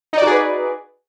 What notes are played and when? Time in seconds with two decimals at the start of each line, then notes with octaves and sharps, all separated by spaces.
0.13 D#4
0.18 D5
0.22 F#4
0.27 G#4
0.31 B4